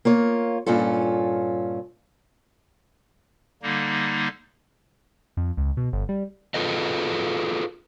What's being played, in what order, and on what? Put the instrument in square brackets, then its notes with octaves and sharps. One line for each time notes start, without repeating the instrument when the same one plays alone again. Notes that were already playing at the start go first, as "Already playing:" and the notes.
[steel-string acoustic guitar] A#3 F4 C#5
G2 A#2 C#4 F4 A4
[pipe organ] D3 G3 A#3 D#4
[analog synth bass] F2
C#2
B2
G1
G3
[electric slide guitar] F4 G#4 A4 B4 D#5